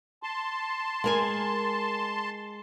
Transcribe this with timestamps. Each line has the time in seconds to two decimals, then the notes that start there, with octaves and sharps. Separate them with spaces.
0.23 A5 C6
1.04 G#3 A#4 G#5